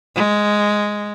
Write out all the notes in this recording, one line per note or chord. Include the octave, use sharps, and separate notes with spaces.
G#3